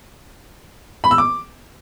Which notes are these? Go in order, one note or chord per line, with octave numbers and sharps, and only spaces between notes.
B5
E6
D6